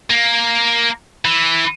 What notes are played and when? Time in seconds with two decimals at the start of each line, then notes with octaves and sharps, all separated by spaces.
0.10 A#3
1.25 E3